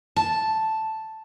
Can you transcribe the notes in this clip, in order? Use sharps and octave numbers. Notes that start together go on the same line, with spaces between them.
A5